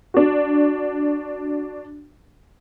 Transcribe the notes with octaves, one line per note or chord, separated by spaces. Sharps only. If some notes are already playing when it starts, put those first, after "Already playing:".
D4 F#4